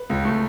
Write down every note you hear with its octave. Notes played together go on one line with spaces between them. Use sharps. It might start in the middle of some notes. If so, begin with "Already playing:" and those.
Already playing: B4
C#2
A3